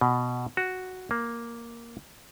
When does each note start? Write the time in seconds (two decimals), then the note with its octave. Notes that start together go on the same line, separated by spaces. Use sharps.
0.01 B2
0.57 F#4
1.11 A#3